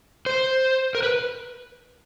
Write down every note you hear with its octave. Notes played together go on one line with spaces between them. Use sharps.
C5
A#4
B4